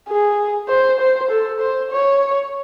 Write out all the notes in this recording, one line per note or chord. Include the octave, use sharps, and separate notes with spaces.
G#4
C5
C5
A4
C5
C#5